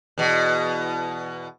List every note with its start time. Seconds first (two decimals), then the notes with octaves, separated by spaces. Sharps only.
0.18 E2 B2